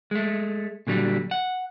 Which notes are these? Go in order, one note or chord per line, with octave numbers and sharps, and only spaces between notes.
G#3 A3
A#2 D3 F#3 G3
F#5